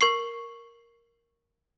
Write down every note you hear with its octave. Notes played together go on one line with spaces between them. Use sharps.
A#4 C#6 C7